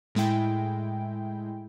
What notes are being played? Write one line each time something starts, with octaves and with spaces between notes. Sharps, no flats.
A2 G#3 E4 G5